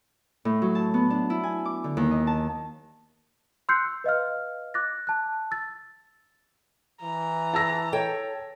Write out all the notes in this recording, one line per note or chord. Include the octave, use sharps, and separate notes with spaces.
A2
F#3
A5
B3
D4
E4
G#5
D6
D3
D#2
D#5
A5
C6 E6 F#6 G6 C7 C#7
E6
B4 D#5 F5 F6
D6 F#6 A6 A#6
A5 F#6
E6 A6
E3 A#5
A5 E6 A#6
A4 C#5 G5